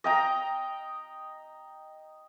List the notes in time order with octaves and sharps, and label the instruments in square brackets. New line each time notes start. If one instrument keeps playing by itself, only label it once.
[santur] D#5 G5 A#5